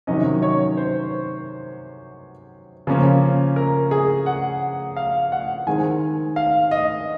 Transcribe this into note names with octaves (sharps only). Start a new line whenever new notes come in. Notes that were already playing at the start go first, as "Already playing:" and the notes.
C3 D#3 F#3 C#4 D#5
C#5
C5
C#3 F3 A#3 C#4
A#4
G#4
F#5
F5
F#5
D#3 G#3 C4 G#5
F5
D#5